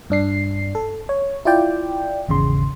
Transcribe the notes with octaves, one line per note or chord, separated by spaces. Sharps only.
G2 D4 C7
A4
C#5
E4 F4 D5 G5
G#1 E2 C#3 C6